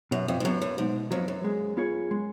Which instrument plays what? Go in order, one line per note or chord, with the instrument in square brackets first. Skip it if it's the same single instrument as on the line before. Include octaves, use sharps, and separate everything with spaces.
[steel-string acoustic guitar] F#2 [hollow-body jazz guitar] B2
[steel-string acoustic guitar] F2
G#2
[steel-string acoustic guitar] F#2 [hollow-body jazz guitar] F#3 B3
[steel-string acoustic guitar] F#2
[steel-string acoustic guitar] G#2 [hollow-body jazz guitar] B2
[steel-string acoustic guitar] F2 [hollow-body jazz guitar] F#3 B3
[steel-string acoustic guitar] F#2
[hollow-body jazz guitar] G#3
B3 F4 G#4 C#5
G#3